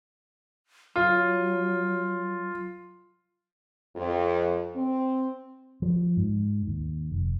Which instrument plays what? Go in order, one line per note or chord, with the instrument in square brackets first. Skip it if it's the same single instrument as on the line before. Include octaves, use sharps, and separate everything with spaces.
[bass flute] F#3 [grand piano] F4
[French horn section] F2
C4
[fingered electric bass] F3
G#2
D#2
F1